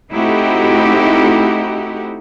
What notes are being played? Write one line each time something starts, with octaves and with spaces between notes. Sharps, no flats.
A3 C4 D#4 E4 F#4 G4